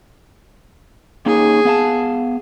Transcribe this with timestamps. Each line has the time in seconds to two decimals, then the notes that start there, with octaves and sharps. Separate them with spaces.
1.26 A#3 C#4 D#4 G#4
1.65 B3 F5 A5